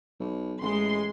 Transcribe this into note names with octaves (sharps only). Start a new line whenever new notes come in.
B1
A1 G#3 C6